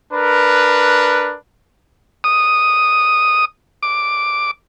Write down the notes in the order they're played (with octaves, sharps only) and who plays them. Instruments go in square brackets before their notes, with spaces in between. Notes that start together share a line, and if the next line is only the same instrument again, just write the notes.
[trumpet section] D4 A#4 B4
[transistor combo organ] D#6
D6